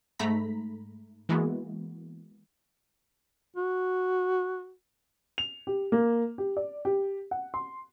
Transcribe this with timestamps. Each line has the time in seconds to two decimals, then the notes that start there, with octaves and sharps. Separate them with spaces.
0.19 G#2 A3 A#5 B5 B6
1.29 E3 G#3 A#3 B3 F#4
3.56 F#4
5.38 F7
5.67 G4
5.92 A#3
6.38 G4
6.57 D5
6.85 G4
7.31 F#5
7.54 C6